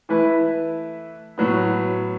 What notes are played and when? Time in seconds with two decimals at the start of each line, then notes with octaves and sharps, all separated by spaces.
0.09 E3 A3 E4 B4
1.38 A2 F#3 B3